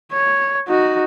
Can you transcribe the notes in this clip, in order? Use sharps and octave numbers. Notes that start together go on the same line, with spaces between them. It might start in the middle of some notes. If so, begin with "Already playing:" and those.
C#5
D#4 F#4